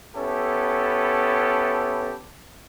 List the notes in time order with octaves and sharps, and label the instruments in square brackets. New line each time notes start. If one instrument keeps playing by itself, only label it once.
[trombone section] B3 C#4 E4 G4 A4